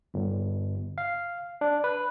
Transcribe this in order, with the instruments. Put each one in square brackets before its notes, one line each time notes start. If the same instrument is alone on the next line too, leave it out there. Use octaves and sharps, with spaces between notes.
[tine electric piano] G1
F5
D4
B4